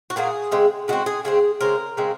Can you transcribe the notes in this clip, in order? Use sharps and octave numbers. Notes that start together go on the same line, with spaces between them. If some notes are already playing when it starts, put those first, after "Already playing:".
F#4
A#2 F#3 A#3 G#4
C#3 G#3 C4
C#3 G#3 C4 F#4
G#4
C#3 G#3 C4 G#4
C#3 G#3 C4 A#4
C#3 G#3 C4